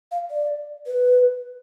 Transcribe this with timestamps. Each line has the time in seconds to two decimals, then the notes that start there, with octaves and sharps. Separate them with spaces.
0.12 F5
0.30 D5
0.86 B4